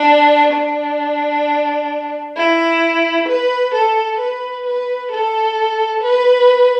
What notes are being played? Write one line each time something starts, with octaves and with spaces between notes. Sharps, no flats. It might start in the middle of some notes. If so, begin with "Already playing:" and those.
Already playing: D4
D4
E4
B4
A4
B4
B4
A4
B4